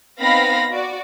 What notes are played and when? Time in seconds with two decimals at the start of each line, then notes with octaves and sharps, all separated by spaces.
0.20 B3 C4 D#4 F5 B5 A#6
0.71 F#4 D5